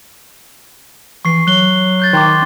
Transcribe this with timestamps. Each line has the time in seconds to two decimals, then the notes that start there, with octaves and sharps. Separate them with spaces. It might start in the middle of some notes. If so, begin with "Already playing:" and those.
1.25 E3 C#6 C7
1.47 F#3 F#6 G7
2.00 F#6 G6 A6
2.13 D#3 C6 D6